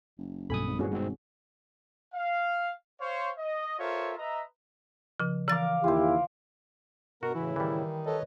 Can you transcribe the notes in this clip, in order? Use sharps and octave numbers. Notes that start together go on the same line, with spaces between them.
F#1
B1 G2 B2 A4 G#5 B5 D#6
G#1
G2 A#2 E3 C#4 F#4 G#4
G#1 G#2 B2 C4
F5
C5 C#5 F5
D#5
F4 A4 A#4 C5 C#5 E5
B4 D#5 E5 A#5
C#3 F3
E3 A#4 F5 D6 A6
D#2 E4 F4 G4 C5
G2 B2 B3 F#4 A#4
A2 C#3 E3 E4
D#3 E3 G3
A4 B4 C#5 D#5